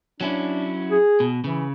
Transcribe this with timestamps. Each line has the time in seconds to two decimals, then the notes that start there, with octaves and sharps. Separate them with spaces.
0.21 F#3 C#4 D4 E4
0.91 G#4
1.20 B2
1.44 C#3 E3